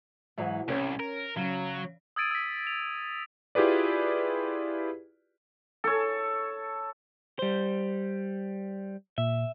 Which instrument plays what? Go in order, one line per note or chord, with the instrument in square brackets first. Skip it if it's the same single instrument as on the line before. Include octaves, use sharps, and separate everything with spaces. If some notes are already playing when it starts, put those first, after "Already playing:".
[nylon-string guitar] G#2 E3 F#3
[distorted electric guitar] C2 [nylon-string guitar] C#4 C#5
[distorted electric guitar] A#4
[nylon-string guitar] C#3 [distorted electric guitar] F#3
[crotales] D#6 E6 G#6 A6 D7 D#7
E6 B6
F7
[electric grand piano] E4 F4 G4 G#4 B4 D5
[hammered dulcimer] A4 C#5
[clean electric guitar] G3 C5
[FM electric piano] A#2 [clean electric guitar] E5